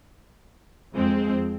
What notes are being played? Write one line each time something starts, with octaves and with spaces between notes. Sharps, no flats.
F2 G#3 C4